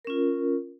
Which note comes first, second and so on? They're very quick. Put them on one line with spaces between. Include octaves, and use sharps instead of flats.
A#4 C#4 F4